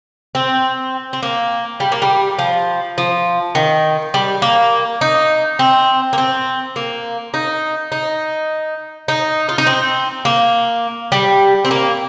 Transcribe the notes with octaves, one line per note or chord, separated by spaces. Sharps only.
C4
C4
A#3
G3
A#3
G3
F3
F3
D#3
G3
A#3
D#4
C4
A#3
C4
A#3
D#4
D#4
D#4
F4
D#4
C4
A#3
G3
C4
A#3